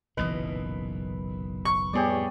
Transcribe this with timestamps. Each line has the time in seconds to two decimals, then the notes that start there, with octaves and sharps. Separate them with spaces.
0.17 F#1 B1 A#2 E3 B4 D#5
1.65 C#6
1.93 F2 A2 G3 B3 G4 G#4 C#5 D5